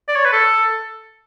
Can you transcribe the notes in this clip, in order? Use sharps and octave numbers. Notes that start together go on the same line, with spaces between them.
D5
C#5
B4
A4